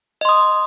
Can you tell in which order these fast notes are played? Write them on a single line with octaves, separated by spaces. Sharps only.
D#5 C6 D#6